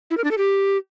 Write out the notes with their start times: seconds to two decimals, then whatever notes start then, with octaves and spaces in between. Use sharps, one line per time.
0.10 E4
0.17 A#4
0.24 D4
0.31 A4
0.38 G4